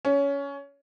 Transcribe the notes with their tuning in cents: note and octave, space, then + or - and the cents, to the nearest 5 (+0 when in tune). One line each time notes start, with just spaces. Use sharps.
C#4 +20